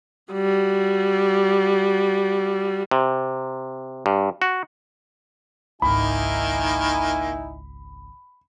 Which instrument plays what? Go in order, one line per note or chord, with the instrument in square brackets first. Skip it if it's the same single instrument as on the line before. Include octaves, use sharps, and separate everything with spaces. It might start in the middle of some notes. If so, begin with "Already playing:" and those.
[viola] G3 F#4
[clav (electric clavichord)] C3
G2
F#4
[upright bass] G#1 C#2 [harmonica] D#3 A#3 [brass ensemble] D#4 E4 G#5 [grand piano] B5